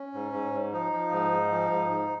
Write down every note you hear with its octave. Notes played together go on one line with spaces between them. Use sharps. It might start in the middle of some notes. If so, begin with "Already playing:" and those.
Already playing: C#4
G#2
G#2
G#2
F3 D#4
F3
G#2
G#2
F3
G#2
G#2